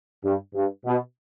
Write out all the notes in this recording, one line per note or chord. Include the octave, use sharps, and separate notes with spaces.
G2
G2
B2